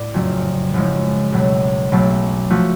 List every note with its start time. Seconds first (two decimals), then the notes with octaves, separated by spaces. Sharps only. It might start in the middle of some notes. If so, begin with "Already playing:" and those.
Already playing: A2 D5
0.14 F#1 F2 C#3 F#3 A3
0.74 F#1 F#2 F3 G#3
1.32 C#2 B2 F#3 A3
1.92 B1 B2 F#3 A3
2.50 F3 A3 F#4